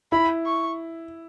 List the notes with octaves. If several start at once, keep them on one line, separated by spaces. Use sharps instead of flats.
E4 B5
C#6